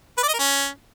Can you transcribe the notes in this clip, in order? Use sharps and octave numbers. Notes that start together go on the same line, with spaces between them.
B4
D5
D#5
A#4
C#4